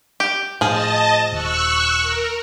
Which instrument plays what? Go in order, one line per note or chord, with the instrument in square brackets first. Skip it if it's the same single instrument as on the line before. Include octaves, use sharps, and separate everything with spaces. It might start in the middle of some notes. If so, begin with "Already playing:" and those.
[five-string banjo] G4
[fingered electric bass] A2 [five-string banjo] F3 G#4 [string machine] D#5 A5
[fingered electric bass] D#1 [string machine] C#6 E6 F#6
[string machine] A#4